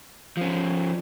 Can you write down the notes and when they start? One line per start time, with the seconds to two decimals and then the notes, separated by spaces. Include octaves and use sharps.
0.37 F3 C#4